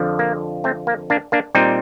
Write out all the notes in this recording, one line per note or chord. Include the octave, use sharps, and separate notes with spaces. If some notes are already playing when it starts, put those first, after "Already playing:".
Already playing: F2 D3 F3
A#3
A3 C4
A#3
A#3 D4
A#3 D4
A#2 G3 C4 D#4